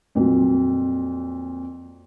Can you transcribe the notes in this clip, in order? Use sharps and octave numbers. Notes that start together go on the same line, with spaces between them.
F2 A#2 F#3